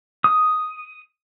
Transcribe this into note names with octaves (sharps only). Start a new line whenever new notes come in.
D#6